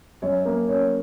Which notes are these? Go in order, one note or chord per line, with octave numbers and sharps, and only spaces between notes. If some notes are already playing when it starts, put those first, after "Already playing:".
F#2 C#5
A#3 A#4
C#4 C#5